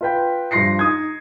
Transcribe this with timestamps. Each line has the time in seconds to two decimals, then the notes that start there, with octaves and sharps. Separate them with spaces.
0.01 F4 B4 G5
0.51 G2 F3 C6 A#6 C7 C#7
0.79 D#4 D#6 G#6